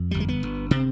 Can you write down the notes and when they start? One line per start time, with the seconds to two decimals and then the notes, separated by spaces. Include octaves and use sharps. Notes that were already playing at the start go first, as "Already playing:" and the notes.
Already playing: F2
0.11 G1 G3
0.20 G#3
0.28 B3
0.43 G1
0.71 C3 C4